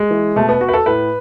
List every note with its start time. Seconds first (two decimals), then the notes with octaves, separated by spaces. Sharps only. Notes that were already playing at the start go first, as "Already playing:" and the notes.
Already playing: G#3
0.11 E3
0.36 B2 A3
0.49 B3
0.61 F#4
0.69 B4
0.73 A4
0.86 A2 B4